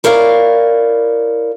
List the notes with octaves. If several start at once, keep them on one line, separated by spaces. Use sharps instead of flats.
E4 A#4 C#5 D5 F5